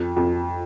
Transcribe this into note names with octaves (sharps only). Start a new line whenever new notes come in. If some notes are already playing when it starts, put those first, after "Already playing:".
Already playing: F2
F2